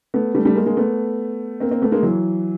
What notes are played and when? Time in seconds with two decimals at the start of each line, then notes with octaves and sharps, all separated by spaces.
0.14 A3 B3
0.35 G3 A3
0.45 G3 A3
0.55 G#3 A#3
0.66 G#3 A#3
0.77 A3 B3
1.60 A#3 C4
1.71 A#3 C4
1.81 A3 B3
1.92 G#3 A#3
2.03 E3 F#3